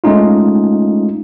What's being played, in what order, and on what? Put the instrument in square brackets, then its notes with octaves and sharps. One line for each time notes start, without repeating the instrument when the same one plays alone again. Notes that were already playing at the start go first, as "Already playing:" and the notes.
[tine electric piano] G#3 A3 C#4 D#4 F4